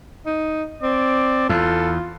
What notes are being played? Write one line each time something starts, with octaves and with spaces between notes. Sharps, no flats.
D#4
C4 D5
E2 F4 A4